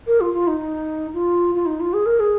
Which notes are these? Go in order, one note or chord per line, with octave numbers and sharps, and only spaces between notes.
A#4
F4
F4
D#4
F4
F4
D#4
F4
G#4
A#4
G#4